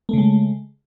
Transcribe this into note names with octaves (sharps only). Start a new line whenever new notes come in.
C#3 G#3 A3